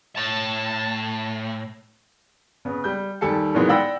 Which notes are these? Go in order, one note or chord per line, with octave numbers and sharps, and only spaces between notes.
A2 A5
C#3 B3
G3 G6
D#2 G3 A4 G#5 A5 C#7
A#2 D#3 E3 F#3 G#3 B3
D5 F#5 G5 B5 E6 A#6